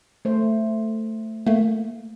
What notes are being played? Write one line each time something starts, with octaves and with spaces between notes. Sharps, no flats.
A3 C5
A3 A#3